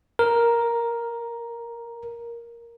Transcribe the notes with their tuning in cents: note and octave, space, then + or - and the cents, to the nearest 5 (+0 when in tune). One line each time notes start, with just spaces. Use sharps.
A#4 +5